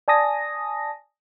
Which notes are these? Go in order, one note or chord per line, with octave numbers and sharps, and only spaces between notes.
D5 G#5 A5 D#6 A#6